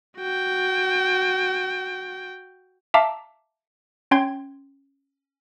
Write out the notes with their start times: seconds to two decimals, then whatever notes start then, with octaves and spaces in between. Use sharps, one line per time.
0.17 F#4 G5
2.94 E5 F5 A5 A#5 D6
4.11 C#4 G5 C6 G#6